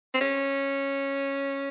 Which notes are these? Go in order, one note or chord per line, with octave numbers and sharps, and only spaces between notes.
C4
C#4